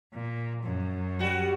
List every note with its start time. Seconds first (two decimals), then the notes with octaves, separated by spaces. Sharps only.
0.13 A#2
0.62 F#2
1.19 G3 F#4